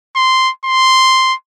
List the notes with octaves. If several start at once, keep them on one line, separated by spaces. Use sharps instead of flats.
C6
C6